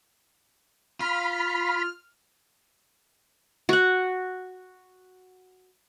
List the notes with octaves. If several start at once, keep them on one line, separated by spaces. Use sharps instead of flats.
F4 B5 F6
F#4 F#5